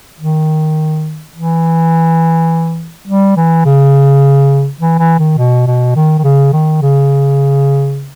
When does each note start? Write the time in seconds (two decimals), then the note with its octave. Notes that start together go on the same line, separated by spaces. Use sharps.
0.20 D#3
1.36 E3
3.08 G3
3.37 E3
3.66 C#3
4.81 E3
4.99 E3
5.19 D#3
5.38 B2
5.67 B2
5.96 D#3
6.19 D#3
6.24 C#3
6.53 D#3
6.82 C#3